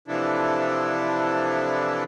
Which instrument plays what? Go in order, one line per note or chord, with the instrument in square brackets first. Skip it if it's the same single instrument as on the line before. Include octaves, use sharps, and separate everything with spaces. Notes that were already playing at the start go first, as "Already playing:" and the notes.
[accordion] C3 E3 F3 D4 E4 A4